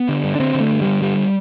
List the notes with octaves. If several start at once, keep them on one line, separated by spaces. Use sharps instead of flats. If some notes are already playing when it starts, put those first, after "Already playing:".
Already playing: B3
D3
G2
D4
D3 C4
D3
A3
G2
D3 G3
G2 G3